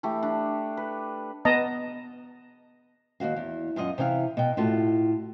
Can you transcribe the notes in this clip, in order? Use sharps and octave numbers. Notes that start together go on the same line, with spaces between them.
E3 A3 G4
D4
B4
B3 D#5 A5 A#5
D#2 D#3 F#4 F5
E2
F#2 F4 D#5 F#5
C3 E3 D#5 F5
B2 G5
A2 F4 F#4 A4